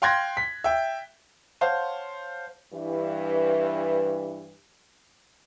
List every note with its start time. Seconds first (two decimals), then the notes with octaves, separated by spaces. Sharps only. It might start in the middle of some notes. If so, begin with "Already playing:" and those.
0.02 F5 G5 C6 F#6 G#6 A#6
0.37 B6
0.64 E5 G5
1.61 C5 C#5 F5 F#5 A5 C6
2.74 G2 E3